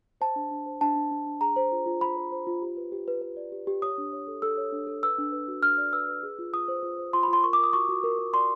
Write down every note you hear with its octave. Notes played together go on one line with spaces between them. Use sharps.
C5 A5
D4
D4
C5
D4 A5
D4
D4
D4
G#4 A#5
C5
F4
F4
F4 B5
C5
C5
F4
G4
B4
G4
B4
B4
D5
G4
G4
C#5 D#6
D4
C#5
A4
A4 E6
C#5
D4
A4
B4 E6
D4
B4
F#4
D4 F6
D5
B4 E6
B4
G#4
F4
F4 D#6
C5
F4
C5
F4 C6
B5
F4
C6
A#4 C#6
D6
A#4 D#6
F#4 C#6
F#4
A#4
A#4
D5 C6